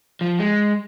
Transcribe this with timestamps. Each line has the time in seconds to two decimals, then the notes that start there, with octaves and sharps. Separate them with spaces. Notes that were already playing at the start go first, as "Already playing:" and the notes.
0.21 F3
0.39 G#3